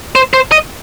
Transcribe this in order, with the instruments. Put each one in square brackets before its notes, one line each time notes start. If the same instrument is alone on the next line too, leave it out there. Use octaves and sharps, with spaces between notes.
[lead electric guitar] C5
C5
D#5